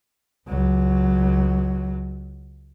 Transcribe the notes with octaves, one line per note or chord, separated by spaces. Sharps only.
C#2 F#3